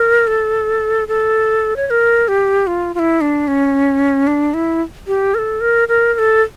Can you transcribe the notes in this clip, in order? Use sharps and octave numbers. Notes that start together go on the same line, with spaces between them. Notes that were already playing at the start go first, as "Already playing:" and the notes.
Already playing: A#4
A4
A4
C#5
C#5
A#4
G4
F4
F4
E4
D4
C#4
D4
E4
G4
A#4
A4
A#4
A#4
A#4
A4